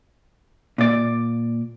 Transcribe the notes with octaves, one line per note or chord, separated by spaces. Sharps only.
A#2 D5